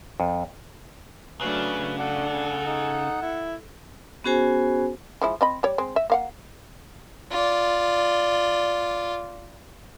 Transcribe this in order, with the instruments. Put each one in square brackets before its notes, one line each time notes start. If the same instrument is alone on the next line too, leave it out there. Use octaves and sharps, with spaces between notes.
[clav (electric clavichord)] F2
[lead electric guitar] C#3 [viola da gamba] F#3 A3 D4 [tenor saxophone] B4
[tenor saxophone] D4 [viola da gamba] A4 [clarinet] F#5
[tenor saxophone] D#4
E4
[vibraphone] B3 C#4 F#4 G#4 C5 G#5
[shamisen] F3 G#3 E4
C4 D#5 B5
G3 C#5 D5
G#3 C4
E5
A#3 F5 F#5
[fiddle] F4 D5